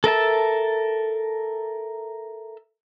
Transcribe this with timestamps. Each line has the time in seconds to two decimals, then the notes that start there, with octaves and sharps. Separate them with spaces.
0.04 A4 A#4 E5 A5